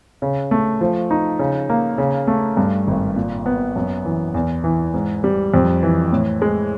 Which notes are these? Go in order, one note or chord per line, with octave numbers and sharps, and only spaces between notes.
C#3
A3
F3
D#4
C#3
A#3
C#3
A3
G2
G#1
A#2
B3
F#2
E3
E2
E3
G#2
G3
F2
E3
A2
G#3